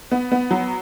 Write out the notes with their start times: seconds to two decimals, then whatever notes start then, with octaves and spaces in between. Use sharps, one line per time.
0.11 B3
0.32 B3
0.51 F#3